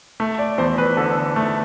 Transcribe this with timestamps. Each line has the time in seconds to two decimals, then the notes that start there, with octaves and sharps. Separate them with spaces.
0.20 A3
0.39 D5
0.58 E2 C5
0.78 B4
0.97 D3 A4
1.36 A3